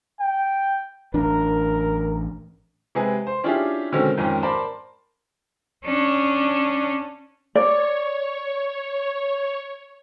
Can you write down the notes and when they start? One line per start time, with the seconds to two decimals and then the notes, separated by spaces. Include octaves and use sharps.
0.19 G5
1.14 A1 D4 A#4
2.95 C3 G#3 G#4 B4
3.27 C5
3.44 C#4 D4 E4 F4 G4 G#4
3.92 B2 D3 D#3 G#3 C4 C#4
4.17 F2 G#2 D#3 C4 C#4
4.43 A#4 C5 D5 A5 B5
5.85 C#4 D4
7.55 C#5 D5